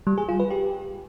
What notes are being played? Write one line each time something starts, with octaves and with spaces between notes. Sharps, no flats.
G3
G#4
F4
B4
G4